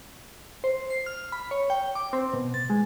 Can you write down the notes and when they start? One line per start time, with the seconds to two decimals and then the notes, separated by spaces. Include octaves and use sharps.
0.64 C5
0.90 C7
1.06 F6
1.32 B5
1.51 C#5
1.70 G5
1.95 D6
2.13 C4
2.33 B2
2.54 A6
2.70 G#3